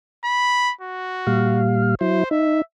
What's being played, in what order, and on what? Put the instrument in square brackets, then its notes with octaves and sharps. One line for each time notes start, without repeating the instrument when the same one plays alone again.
[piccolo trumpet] B5
F#4
[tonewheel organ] A#2 G3 F5
[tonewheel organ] F#3 E4 [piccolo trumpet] C5
[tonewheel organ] D#4 [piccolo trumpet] E5